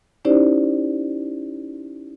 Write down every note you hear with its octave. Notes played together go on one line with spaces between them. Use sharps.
C#4 D#4 E4 G4 C5 D5